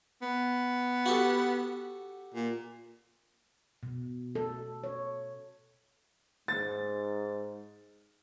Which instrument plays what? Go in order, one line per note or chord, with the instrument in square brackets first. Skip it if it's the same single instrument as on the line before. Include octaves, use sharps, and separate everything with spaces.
[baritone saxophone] B3
[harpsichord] F#4 G4 A4
[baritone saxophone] A#2
[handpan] B2
A4
C#5
[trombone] G#2 [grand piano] A6